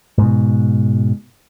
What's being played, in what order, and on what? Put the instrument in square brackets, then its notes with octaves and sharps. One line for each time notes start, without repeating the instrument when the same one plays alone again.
[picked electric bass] G#2 B2